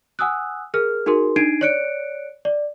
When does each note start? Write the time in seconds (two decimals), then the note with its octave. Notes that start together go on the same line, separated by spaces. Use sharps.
0.19 F#5 G#5 D#6 E6 F#6
0.74 G#4 A#4 F6
1.06 D#4 F#4 G#4 A#4 C6
1.36 D4 D#4 G#6 C7 D7 D#7
1.61 C#5 D5 F#6 C#7 D7
2.45 D5